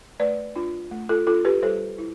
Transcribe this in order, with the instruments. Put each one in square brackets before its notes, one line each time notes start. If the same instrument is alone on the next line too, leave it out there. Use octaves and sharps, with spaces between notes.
[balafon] A3 B4 D5
D4 F4
A3
F4 A4
D4 F4 A4
G4 B4
G3 A4 C5
E4